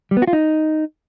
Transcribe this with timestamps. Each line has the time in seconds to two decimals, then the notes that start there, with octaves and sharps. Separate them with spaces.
0.11 G3
0.17 B3
0.22 F#4
0.28 F4
0.33 D#4